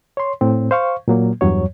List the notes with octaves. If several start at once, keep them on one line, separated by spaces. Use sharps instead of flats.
C#5 C6
A2 C4
C5 F5 C#6
A#2 F#3 A#3
E2 G2 F#3 C#5